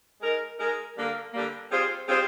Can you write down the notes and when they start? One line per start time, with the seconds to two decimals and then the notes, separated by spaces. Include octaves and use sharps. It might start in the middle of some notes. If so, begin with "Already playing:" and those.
0.20 G#3 D#4 A#4
0.59 G#3 D#4 A#4
0.96 D3 G3 A#3
1.33 D3 G3 A#3
1.70 G3 C4 F4 G#4 C5
2.08 G3 C4 F4 G#4 C5